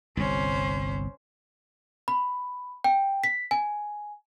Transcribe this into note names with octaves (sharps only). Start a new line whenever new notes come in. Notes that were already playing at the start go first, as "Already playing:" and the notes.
G1 C2 C#4 C5
B5
G5
B6
G#5